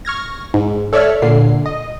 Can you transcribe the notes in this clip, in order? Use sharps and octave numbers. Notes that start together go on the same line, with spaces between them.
C#6 F6 G#6 A#6
G#2
A4 C#5 D5 E5 E6 F6
A#2 D3 C7
D#5